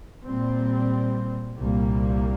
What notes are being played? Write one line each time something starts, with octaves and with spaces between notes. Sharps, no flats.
A#2 G3 C4
C2 A#2 G3 A#3